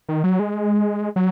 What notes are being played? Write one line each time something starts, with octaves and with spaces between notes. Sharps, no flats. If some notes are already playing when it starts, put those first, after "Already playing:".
D#3
F#3
G#3
F#3